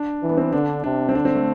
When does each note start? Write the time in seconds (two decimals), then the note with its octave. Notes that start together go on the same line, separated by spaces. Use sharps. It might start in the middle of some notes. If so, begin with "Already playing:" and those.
Already playing: D4
0.22 E3
0.29 B3
0.37 C4
0.53 D3 D4
0.84 C3 D4
1.09 C4
1.15 D3 D4
1.25 C4
1.35 A3